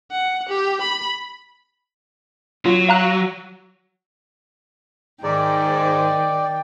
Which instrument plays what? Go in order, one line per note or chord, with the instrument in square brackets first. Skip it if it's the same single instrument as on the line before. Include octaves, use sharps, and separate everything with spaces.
[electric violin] F#5
G4
B5
[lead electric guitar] F#3 [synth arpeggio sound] F4
[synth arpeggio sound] F5 A#5 F#6
[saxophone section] G#2 [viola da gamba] D#3 [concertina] D5 [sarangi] G5